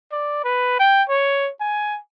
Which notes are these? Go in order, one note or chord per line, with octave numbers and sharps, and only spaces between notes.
D5
B4
G5
C#5
G#5